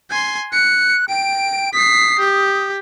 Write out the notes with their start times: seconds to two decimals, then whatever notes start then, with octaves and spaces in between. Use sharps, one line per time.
0.10 G#5 C6
0.52 F#6 C#7
1.09 G5 D7
1.73 D#6 B6 C7
2.19 G4